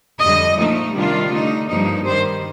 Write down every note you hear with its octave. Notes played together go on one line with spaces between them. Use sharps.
F2 D3 G3 D#5
A#2 F3 A3 D#4
C3 D#3 G3 D4 F4
D3 A3 D#4
G2 F3 A#3 D#4
G2 D#3 G3 C5